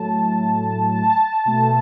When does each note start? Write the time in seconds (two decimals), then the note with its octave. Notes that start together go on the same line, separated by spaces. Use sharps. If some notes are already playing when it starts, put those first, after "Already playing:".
Already playing: A2 F#3 A3 A5
0.92 A5
1.45 B2 A3